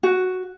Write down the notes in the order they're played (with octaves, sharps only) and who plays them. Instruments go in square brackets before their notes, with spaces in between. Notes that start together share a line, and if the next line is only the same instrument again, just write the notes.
[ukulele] F#4